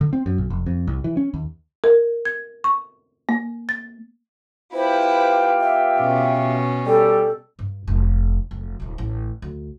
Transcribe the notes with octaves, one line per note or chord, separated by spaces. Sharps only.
D3
C4
F#2
B1
F1
F2
C2
E3
C#4
D#2
A#4
G#6
C#6
A#3
A6
B3 E4 F4 G4 B4 C5
E5
B2 C#4
G3 A4
G2
F1 D#4
F1
D#1 D#2
A1
D2